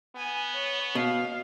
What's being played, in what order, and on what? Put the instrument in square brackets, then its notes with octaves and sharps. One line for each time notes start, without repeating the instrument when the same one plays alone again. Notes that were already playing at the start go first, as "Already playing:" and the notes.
[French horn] B3 [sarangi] G#5
[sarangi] C#5
[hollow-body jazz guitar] B2 [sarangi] F5